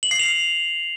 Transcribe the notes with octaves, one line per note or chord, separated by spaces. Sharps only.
F#7
C7
F7